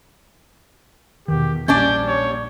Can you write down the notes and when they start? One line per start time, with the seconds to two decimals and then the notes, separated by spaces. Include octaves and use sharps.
1.28 E2 B2 D#3 G4
1.68 A#1 G3 A#3 C#4 D4 D5 G6
2.08 C#5